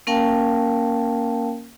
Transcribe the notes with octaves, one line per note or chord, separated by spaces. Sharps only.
A#3 C#4 A#4 F5 G5 A5